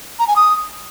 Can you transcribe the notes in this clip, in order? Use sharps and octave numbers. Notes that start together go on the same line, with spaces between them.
A#5
G#5
D#6